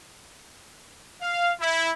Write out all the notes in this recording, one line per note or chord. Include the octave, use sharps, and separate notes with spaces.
F5
E4